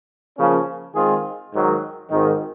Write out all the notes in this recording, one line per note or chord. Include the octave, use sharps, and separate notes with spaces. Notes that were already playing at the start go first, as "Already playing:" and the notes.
C#3 F3 A#3 C#4
D#3 G#3 C4 F4 G#4
G#2 D#3 F#3
G#1 G#2 D#3